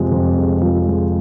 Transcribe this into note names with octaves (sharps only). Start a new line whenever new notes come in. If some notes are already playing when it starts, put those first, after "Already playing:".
Already playing: F2 C3 F3 G#3
F2
G#3
F3
G#3